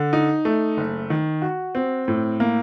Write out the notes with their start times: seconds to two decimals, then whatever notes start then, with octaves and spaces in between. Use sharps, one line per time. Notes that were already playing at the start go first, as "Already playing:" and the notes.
Already playing: D3
0.13 D#4
0.45 A3
0.77 F#1
1.10 D#3
1.42 F#4
1.75 C4
2.08 A2
2.40 A#3